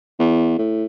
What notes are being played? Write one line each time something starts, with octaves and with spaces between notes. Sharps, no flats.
E2
A2